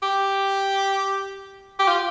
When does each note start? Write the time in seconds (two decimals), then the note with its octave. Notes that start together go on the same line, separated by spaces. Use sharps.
0.03 G4
1.80 G4
1.88 F4